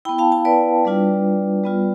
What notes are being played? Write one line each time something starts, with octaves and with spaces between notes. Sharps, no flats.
B3 E4 G5 B5
F5 A5
F5 A5
B4 D5
G3 D4 F4
G3 B3 F4